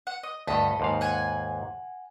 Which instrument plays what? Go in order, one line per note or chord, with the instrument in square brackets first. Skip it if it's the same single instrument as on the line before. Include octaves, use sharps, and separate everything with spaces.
[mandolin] F#5
D#5
[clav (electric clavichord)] D2 G2 [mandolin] A4 D#5 B5
[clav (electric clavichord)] D#2 G#2 F5
[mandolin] F#5 G#5